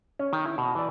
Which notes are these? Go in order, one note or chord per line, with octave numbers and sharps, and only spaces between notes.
C#4 C#5
D#3
E4
B2
E3 D5